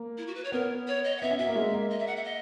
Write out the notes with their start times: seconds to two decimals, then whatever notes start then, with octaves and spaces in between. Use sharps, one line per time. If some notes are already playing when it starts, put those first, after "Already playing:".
Already playing: A#3
0.18 E4
0.27 F#4
0.35 B4
0.45 C#5
0.52 B3 A#4
0.87 C#5
1.04 D#5
1.18 F#5
1.22 B3 E5
1.31 C#4
1.39 F#4 E5
1.47 A#3
1.55 G#3
1.73 A#3
1.91 D#5
1.99 E5
2.07 F#5
2.17 E5
2.24 D#5